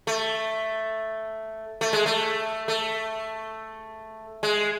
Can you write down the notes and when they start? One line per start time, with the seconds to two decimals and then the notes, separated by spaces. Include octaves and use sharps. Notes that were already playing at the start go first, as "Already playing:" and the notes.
0.07 A3
1.81 A3
1.93 G#3
2.06 A3
2.68 A3
4.43 G#3